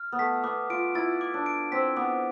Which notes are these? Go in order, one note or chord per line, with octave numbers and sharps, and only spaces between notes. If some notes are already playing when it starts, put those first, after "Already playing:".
Already playing: F6
B3
A3 B6
B3 D6
F4 D7
E4 A6
D6
D4
D7
C4 B6
B3 D6